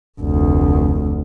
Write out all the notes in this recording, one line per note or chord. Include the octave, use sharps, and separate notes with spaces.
F1 D2